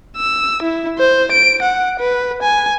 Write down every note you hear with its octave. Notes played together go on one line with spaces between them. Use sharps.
E6
E4
C5
D7
F#5
B4
G#5